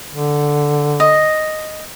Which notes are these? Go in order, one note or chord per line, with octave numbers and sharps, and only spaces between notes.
D3
D#5